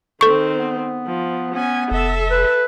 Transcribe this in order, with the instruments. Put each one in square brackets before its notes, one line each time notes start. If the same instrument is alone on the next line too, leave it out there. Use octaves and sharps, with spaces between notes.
[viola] D#3 C4 [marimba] A4 C#6
[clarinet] B3
[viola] F3
[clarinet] B3 [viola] C#4 G#5
[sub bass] F1 [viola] A4 E5
[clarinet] B4